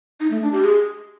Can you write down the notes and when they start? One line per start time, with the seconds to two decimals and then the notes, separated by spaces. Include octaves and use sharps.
0.20 D#4
0.31 A3
0.42 D4
0.52 G4
0.63 G#4